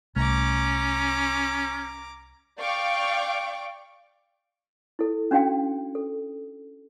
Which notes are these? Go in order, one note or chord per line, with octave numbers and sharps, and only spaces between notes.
C2 A3 C#4 A#5 D6
D5 F5 G5 C#6 D6
E4 A4
C#4 D4 F#4 F5 G5
A4